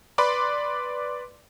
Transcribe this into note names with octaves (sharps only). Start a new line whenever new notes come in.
B4 D5 B5 C6 D6